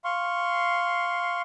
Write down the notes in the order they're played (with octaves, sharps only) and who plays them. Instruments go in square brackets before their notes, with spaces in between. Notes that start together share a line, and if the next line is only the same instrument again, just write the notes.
[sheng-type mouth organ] F5 C6 C#6